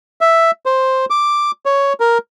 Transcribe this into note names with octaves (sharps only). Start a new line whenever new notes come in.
E5
C5
D6
C#5
A#4